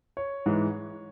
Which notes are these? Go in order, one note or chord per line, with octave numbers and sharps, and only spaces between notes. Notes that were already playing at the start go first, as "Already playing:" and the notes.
C#5
G#2 E3 G#3